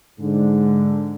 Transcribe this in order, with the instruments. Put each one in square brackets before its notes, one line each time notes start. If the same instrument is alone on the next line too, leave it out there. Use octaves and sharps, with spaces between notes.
[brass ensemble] G#2 D3